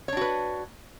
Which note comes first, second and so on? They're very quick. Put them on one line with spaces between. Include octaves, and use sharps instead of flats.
C#5 D4 F#4 B4